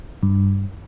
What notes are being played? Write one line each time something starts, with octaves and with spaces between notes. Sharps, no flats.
G2